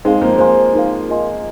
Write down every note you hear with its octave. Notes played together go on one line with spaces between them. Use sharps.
G#3 C4 D#4 G#4 F5
F3 A#3
F3 C5 F5 G#5 C6
D#4 A#4 F5
F4 A#4 D#5 G#5 C6